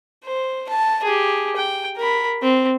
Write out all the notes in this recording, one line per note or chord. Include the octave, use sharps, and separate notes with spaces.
C5
A5
G4 G#4
G5
A#4 B5
C4